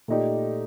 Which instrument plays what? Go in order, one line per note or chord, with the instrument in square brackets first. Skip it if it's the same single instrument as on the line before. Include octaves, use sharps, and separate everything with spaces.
[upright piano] A#2 A3 D#4 G4 D5